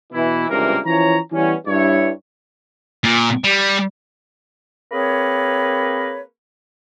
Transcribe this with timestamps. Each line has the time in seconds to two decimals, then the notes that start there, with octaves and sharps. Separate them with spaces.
0.12 B2 E3 E4
0.50 C#2 G2 C3 E3 A#3 A#4
0.85 E3 F3 C#4 C#5 A#5
1.32 E3 G3 B3 C#4
1.67 G2 E4 C#5
3.04 A#2
3.44 G3
4.91 A#3 C4 G#4 A#4 B4 C#5